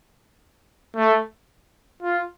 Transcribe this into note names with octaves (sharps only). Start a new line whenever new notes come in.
A3
F4